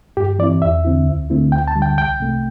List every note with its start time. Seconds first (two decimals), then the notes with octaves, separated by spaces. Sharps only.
0.17 G2 G4
0.39 E3 C4 E4 D5
0.62 E2 E5
0.85 D3 C4 E4
1.07 D2
1.30 D3 A3 C4 E4
1.52 D2 G5
1.68 A5
1.75 D3 G3
1.82 G5
1.97 C2 G5
2.20 C3 A3